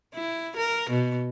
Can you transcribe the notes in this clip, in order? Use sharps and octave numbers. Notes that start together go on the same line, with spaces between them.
E4
A#4
B2